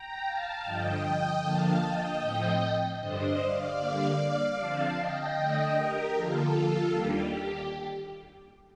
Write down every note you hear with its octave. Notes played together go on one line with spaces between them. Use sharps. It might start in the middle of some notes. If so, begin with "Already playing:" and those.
Already playing: G5 A#5
F5 A5
G2 D3 F3 D#5 G5
D3 F3 A#3 D4 F5 A5
D#5 G5
A2 F3 A3 C4
G2 D3 G3 D4 C5 D#5
D5 F5
D3 G3 A#3 D4
D3 F3 C4 F5 A5
D#5 G5
D3 A3 D4
G4 A#4
D3 F3 A#3 F4 A4
D#2 D#3 G3 A#3 D4 G4